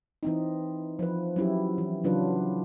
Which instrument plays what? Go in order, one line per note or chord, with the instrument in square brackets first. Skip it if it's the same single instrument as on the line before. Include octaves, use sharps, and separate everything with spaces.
[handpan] E3 C4 D#4
F3 B4
F#3 C#4 E4 G4
E3
C#3 E3 F#3 D4 F4 B4